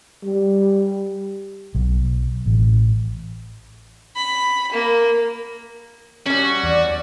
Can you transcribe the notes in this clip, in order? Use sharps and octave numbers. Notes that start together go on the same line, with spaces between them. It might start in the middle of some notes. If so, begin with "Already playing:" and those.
G3
B1
A1
B5
A#3
G3 C#4 F#4
E2 D5